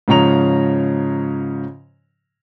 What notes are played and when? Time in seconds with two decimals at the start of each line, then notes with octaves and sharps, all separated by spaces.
0.08 G#2 C#3 F3 C#5 A#5 F7